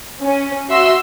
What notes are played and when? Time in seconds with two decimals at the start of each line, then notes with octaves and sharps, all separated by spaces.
0.22 C#4
0.69 F#4 E5 C6 E6